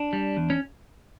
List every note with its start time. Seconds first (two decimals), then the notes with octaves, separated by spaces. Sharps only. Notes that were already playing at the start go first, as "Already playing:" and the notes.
Already playing: D4
0.13 G3
0.37 E2
0.50 C#4